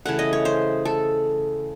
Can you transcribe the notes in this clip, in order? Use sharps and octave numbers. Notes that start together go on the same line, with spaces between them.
C#3 E3 A3 F#5
D#5
C#5
C5
A4